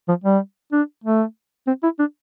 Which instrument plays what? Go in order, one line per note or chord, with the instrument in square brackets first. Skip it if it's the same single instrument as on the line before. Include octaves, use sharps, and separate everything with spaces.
[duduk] F3
G3
D4
A3
C4
E4
D4